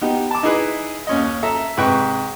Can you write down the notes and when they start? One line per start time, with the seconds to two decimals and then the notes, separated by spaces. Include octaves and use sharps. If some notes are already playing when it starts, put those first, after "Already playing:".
0.01 B3 D#4 G4
0.31 A5 D6
0.43 D#4 E4 G#4 B4
1.07 D#2 C#4 D#5
1.43 A4 E5 A#5
1.77 G#2 C3 B4 G5 C#6